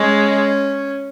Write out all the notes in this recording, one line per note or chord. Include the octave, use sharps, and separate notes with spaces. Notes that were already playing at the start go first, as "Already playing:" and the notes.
Already playing: G#3 C#4